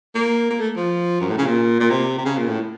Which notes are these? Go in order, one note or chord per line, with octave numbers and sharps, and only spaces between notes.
A#3
A#3
A3
F3
F#2
A2
C#3
A#2
A#2
C3
C3
C#3
A#2
A2